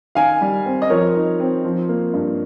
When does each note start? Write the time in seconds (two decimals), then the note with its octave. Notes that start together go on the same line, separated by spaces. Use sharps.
0.15 D#3 F5 G#5
0.41 G3
0.66 C4
0.82 D#5
0.89 F3 A#4 C#5
1.15 D#4
1.40 C4
1.65 F3
1.89 A#3
2.13 G2